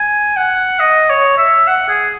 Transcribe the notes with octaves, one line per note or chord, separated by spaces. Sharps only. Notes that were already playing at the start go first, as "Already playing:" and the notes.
Already playing: G#5
F#5
D#5
C#5
E5
F#5
G#4